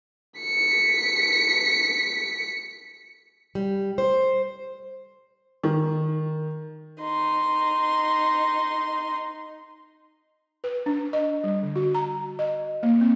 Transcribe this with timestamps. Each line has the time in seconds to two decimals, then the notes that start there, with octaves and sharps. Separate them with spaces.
0.41 B6 C#7
3.55 G3
3.98 C5
5.63 D#3
7.00 D#4 C6
10.64 B4
10.86 D4
11.13 D#5
11.44 G3
11.63 D3
11.76 F#4
11.95 A#5
12.39 D#5
12.83 A#3
13.01 C4